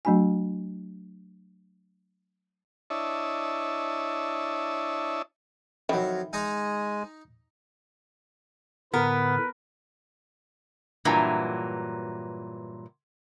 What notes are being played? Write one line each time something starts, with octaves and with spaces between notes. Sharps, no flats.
F#3 A3 D4 F#4 G#5
D4 E4 C#5 D#5 E5 A5
F2 D#3 F#3 E4
G#3 D#4 D#5 G#5 A#5
A2 D3 B3 A#4 B4
G2 A#2 E3 F#3